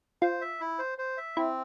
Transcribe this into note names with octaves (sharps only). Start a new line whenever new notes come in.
F4 C5
E5
E4
C5
C5
E5
C4 E4